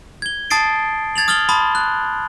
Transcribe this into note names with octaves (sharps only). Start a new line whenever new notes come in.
G#6 G7
A5 D#6 A6 C7 D7
G#6 A6 F7 F#7
D#6 F6 A6 F#7 G7
A5 B5 C6 D#6
F#6